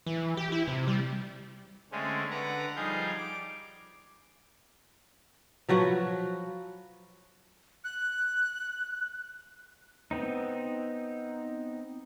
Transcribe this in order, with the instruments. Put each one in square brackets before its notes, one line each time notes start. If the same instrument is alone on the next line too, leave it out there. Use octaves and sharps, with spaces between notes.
[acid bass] E3
G4
E4
C3
G3
[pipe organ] D3 G#3 A3 C4 C#4
D3 B4 F#5 A#5
F3 G3 D#4 G#4 F5 G6
D6
[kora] F3 F#3 F#4 B4
[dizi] F#6
[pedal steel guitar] B3 C4 D#4